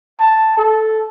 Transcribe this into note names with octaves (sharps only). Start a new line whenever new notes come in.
A5
A4